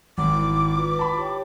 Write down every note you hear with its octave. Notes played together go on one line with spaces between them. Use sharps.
G#1 D6
E4
D#4 F4 B4
A5 B5
G4 C#5 G5